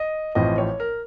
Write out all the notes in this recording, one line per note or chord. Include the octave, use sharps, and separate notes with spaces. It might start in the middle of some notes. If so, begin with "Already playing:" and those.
Already playing: D#5
A1 A2 F3 C4 D#5
C#5
A#4